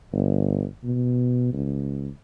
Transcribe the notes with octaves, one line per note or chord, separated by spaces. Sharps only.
G1
B2
C#2